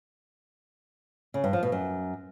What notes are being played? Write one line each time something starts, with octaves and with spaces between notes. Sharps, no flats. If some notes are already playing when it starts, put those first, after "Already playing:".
C#3
G2
F3
B2
F#2